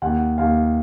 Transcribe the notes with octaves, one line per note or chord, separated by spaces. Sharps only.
D#2 F#5
D#2 F5